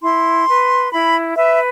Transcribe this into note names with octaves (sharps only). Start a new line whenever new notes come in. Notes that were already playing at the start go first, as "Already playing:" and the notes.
E4 C6
B4
E4 B5
B4 E5